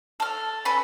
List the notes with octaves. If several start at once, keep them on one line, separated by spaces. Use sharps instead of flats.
A4 F6
C#4 A4 B4